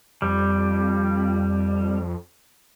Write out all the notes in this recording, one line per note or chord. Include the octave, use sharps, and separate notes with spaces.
F2 G3